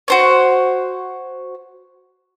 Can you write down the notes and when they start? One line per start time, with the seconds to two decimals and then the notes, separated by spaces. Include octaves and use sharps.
0.08 F#4 C5 C#5